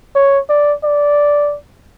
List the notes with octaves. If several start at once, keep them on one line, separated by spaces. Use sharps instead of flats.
C#5
D5
D5